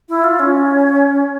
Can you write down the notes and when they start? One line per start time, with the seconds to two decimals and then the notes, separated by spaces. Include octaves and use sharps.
0.09 E4
0.24 F4
0.39 C#4